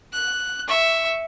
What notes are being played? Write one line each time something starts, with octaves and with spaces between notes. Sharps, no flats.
F#6
E5 C#6